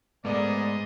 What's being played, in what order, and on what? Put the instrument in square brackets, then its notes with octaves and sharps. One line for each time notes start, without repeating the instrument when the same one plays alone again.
[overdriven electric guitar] G#2 [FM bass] A3 [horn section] B3 A#4 D5 [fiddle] G#4 D#5